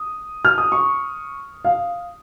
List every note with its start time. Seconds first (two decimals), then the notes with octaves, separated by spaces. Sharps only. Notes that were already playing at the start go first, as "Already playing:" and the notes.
Already playing: D#6
0.45 F6
0.58 D#6
0.72 C#6
1.65 F5